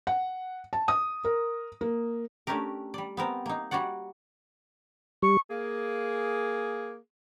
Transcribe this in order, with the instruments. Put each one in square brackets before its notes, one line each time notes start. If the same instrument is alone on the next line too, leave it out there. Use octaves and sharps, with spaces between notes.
[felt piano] F#5
A5
D#6
A#4
A#3
[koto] A3 C#4 D4 G4 A#4
G3 D5
B3 C4 A#4
A#3 D#4
G3 F#4 C#5 D5 F#5
[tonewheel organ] G3 [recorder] C#6
[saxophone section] A#3 G#4